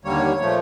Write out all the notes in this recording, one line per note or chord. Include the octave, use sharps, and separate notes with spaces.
D#2 D3 G3 A#3 C#5
A#2 F3 A3